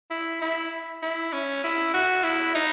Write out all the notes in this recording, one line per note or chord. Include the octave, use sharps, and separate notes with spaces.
E4
E4
E4
C#4
E4
F#4
E4
D#4